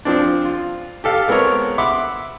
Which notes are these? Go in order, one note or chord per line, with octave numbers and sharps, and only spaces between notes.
F3 C4 D4
F4
G4 A4 F5
G#3 B3 C4 A4 A#4 C#5
E5 F#5 B5 C6 D6